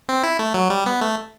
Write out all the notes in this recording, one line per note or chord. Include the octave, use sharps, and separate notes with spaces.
C4
E4
A3
F#3
G3
B3
A3